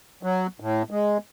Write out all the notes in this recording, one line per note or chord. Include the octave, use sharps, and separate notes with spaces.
F#3
A2
G#3